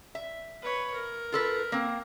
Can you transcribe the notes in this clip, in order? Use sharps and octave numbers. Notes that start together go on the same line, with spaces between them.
E5
B4 C#5
A#4
F4 A4 B4
A#3 C4